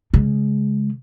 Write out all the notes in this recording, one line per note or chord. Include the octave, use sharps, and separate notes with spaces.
C#3 G#3